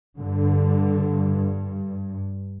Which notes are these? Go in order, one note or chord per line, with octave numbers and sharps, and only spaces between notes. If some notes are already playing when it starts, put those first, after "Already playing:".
G2 D3